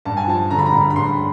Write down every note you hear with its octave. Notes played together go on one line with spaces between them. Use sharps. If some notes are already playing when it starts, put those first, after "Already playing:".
G2 A5
G#5
F3 A5
D3 A#5
B5
A#5
G2
B5
G2 C6